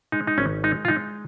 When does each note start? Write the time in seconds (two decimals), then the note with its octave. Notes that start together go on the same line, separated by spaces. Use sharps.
0.12 G#3 D#4
0.27 D#4
0.38 G#1 C#4
0.64 G#3 D#4
0.85 F4
0.88 G#3 D#4